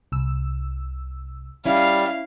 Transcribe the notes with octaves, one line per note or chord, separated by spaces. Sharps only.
C2 E6
G3 C#4 E4 F5